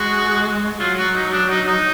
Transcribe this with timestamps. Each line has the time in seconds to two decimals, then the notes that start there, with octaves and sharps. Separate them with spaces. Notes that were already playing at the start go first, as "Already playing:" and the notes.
Already playing: G#3 F#4
0.80 F#3 F4
0.97 F#4
1.14 D#4
1.32 D4
1.49 D#4
1.67 D#4